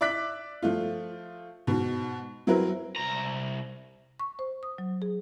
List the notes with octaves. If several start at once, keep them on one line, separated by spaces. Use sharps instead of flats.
D5 E5 D6 F#6 B6
F3 A3 F4
G#2 B2
F#3 C4 E4 A#4 B4
C2 A#5
C#6
C5
D#6
F#3
G#4